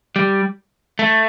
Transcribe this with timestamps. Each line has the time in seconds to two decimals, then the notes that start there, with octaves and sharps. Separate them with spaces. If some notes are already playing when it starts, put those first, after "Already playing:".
0.16 G3
0.99 A3